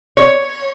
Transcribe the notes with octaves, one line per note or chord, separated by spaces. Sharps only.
C#5